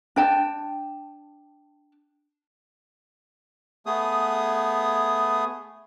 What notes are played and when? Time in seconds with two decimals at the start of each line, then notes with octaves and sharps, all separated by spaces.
0.16 D4 G5 A5
3.86 A3 B3 G#4 D#6